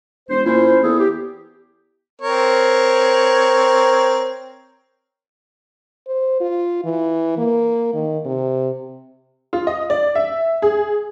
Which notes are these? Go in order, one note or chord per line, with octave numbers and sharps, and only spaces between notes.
E1 C5
A#2 C#4 E4 C5
E2 G#4 A4
G4
C4 A#4 C#5
C5
F4
E3
A#3
D#3
C3
F4
D#5
D5
E5
G#4